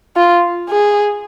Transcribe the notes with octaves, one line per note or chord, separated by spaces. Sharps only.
F4
G#4